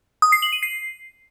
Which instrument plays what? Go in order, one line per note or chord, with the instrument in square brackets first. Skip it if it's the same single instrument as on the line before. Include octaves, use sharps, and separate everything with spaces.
[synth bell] D#6
C7
F#7
D#7
C7